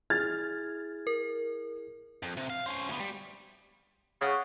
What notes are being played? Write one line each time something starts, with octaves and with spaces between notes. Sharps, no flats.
E4 G#4 F6 G#6 A6
A#4
F2
C3
F5
C#4 C5
D2 B3
G3
C#3 F#5 C#6 D#6